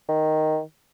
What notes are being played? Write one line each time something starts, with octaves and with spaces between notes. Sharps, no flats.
D#3